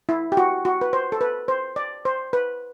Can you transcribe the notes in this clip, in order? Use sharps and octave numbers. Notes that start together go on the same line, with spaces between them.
E4
G4
F#4
F#4
B4
C5
A4
B4
C5
D5
C5
B4